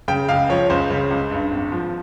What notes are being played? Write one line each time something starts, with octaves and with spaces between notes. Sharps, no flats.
C#3 G5
C#2 F5
F3 C#5
C#2 C5
C#3
C#2
G2
G#1
F3